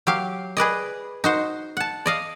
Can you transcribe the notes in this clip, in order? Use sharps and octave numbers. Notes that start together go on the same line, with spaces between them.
F#3 G4 F5
G#4 B4 D5 D#5
D#4 F#4 C5
F#5 A5
D5 D#5 F5